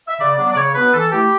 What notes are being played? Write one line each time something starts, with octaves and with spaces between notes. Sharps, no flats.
E5
C#3 D5
F#3 B3 D4 D5
D5
C#3 C#5
F#3 B3 D4 B4
E3 A4
A3 E4 G4